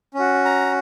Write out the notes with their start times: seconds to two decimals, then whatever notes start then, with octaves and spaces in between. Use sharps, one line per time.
0.14 C#4
0.19 F#4
0.45 A#5